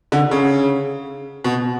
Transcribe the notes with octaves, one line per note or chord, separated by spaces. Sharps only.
D3
C#3
B2